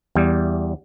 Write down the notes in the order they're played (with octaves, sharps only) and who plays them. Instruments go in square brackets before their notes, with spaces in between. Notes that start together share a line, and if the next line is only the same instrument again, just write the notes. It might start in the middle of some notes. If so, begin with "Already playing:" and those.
[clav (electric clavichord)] E2 G3